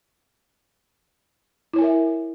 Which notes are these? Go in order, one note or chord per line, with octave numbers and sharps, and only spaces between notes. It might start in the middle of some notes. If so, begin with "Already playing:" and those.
E4 A#4 C#5 E5 G#5